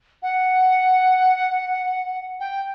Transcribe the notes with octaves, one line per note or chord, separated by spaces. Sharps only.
F#5
G5